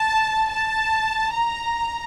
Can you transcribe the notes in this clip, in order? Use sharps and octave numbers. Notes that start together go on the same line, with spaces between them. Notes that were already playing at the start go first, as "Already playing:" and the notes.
Already playing: A5
A5
A#5